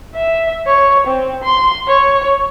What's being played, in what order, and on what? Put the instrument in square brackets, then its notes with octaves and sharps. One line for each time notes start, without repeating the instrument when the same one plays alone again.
[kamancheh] E5
C#5
C4
C6
C#5